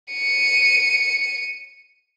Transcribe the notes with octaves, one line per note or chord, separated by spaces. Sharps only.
C#7 D#7